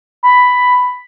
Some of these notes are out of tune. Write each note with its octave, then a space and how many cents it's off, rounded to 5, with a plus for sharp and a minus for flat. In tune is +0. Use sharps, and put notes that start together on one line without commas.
B5 +5